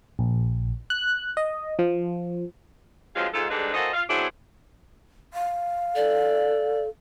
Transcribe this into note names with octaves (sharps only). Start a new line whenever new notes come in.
A#1
F#6
D#5
F3
G2 F3 F#3 G#3 C4 F4
G#2 F4 A4
G#2 D3 G3 G#3 D4 B4
E3 A#3 F#4 A4 C5 D#5
F4 F5
F#3 B3 C4 D4 E4 G#4
F5
A4 D5